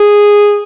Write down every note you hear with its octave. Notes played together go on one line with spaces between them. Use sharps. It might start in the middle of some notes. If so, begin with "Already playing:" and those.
Already playing: G#4